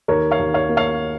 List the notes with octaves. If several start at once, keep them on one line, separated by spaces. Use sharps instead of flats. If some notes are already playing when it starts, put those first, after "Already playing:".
D#2 A#4 C#5
C#5 F5
D#2
C#5 F5
A#3
C#5 F5